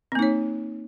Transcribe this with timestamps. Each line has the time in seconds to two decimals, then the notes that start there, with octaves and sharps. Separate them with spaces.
0.12 C4
0.15 A#3
0.19 D#4
0.22 C#5